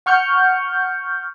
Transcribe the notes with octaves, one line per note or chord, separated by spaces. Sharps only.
F#5 C#6 F6 G6 C#7